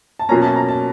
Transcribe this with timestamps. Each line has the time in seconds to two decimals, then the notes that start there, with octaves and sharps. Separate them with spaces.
0.19 A5
0.29 B2 F#3 A#3 C#4 A#5
0.42 A5
0.56 A#5
0.69 A5